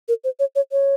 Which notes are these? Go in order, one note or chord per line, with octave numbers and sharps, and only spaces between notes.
A#4
C5
C#5
C#5
C#5